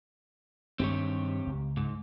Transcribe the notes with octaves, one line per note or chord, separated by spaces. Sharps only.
G2 D#3 G#3 C4 G4 C#5
C#2
G#2